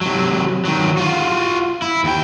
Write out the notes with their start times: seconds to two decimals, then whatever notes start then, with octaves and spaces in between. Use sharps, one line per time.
0.01 C3 F#3
0.65 D#3 F#3
0.97 F4 F#4
1.82 E4
2.04 D#2 G5